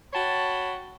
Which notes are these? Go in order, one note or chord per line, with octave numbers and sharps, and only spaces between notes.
F#4 C#5 G5 A5 B5